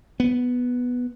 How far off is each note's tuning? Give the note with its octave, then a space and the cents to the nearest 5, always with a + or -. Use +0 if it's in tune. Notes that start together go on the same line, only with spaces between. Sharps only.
B3 +0